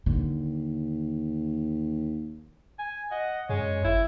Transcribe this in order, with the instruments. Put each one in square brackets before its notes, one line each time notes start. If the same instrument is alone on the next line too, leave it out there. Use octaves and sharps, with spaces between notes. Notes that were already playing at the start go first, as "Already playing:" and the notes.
[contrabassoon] D#2 [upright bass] D3
[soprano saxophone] G#5
[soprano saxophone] D#5 [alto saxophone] F#5
[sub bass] F#2 [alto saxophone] G#3 [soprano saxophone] C#5
[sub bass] G1 [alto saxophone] E4